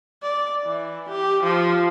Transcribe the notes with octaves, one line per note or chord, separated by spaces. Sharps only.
D5
E3
G4
F3